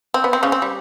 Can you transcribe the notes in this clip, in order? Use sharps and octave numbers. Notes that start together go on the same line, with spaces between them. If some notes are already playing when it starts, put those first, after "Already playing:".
C4
B3
C4
C#3 C#4
C4
G3